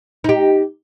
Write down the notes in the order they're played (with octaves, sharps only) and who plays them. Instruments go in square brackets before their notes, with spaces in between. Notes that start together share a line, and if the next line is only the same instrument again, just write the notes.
[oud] D#4 G4